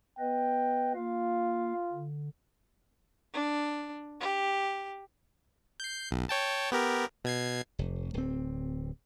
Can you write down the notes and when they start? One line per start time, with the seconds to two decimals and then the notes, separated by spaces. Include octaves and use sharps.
0.19 B3 B4 D#5 G5
0.95 A#3 F4 F5
1.93 D3
3.33 D4
4.19 G4
5.80 G6 C7
6.11 B1
6.29 C#5 G5 A5
6.72 B3 G4 A#4
7.25 B2 G#6 C7
7.79 F1
8.14 D1 C4